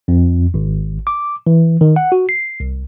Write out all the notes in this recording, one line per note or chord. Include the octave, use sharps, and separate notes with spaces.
F2
G#1
D6
E3
D#3
F#5
F#4
C7
C2